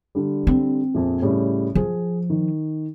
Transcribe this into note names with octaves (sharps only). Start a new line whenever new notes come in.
D3 G3
C4
A#1 F2
A2 C#3 G3
F3 G#4
D#3